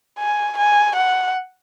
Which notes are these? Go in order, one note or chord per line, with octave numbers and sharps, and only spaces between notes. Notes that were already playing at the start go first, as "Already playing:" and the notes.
G#5
G#5
F#5